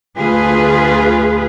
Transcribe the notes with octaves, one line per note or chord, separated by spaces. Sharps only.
D2 F4 G#4 B4